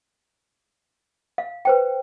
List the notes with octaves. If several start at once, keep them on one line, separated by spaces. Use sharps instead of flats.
F5
B4 C5 G5